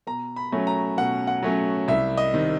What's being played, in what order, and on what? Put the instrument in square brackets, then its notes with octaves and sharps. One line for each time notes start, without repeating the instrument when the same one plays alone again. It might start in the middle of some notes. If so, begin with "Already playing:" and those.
[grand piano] B2 A#5
B5
F#3 A3 C#4
A#5
B2 F#5
F#5
F#3 A3 C#4
C2 E5
D#5
C3 D#3